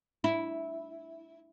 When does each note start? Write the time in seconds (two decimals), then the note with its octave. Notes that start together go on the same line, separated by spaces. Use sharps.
0.24 E4